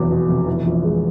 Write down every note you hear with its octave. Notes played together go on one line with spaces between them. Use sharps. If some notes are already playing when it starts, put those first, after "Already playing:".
Already playing: F1 E2 B2 F#3
B2
F1
E3
A#1
G#3